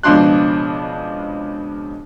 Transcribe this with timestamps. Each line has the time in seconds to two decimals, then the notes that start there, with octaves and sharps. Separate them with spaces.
0.03 C#2 B2 F3 D4 C6 F#6